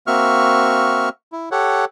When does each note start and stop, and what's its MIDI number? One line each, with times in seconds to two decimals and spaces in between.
0.07 1.09 58
0.07 1.09 60
0.07 1.09 66
0.07 1.09 76
0.07 1.09 85
0.07 1.09 89
1.32 1.49 64
1.51 1.85 67
1.51 1.85 69
1.51 1.85 73
1.51 1.85 78